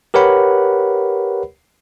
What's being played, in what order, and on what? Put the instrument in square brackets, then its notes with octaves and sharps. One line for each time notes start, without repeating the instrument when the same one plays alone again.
[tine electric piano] G4 A#4 B4 C#5 F#5 B5